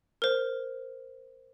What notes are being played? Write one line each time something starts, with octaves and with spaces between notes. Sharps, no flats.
A#4 C5